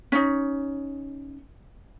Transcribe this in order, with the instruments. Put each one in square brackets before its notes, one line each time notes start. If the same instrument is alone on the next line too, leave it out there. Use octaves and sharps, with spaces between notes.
[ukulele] C#4 D#4